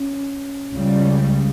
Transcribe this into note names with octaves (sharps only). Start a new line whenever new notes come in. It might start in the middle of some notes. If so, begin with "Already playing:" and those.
Already playing: C#4
C#2 C#3 G3